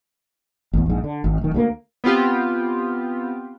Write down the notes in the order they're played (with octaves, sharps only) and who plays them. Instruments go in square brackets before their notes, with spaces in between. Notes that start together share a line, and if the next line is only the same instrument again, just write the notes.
[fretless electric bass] A1 E2
A#1 G#2
D3
G#1
D1 D#3
D2 F#3 A#3
[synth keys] B3 C4 F4 G4